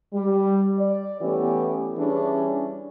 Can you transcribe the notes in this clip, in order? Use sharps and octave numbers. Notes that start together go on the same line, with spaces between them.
G3
D5
E3 A3 B3 C#4 G4
E3 G3 C#4 D4 G#4